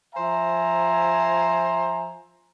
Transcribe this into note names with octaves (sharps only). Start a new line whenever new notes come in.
F3 C5 E5 G#5 A#5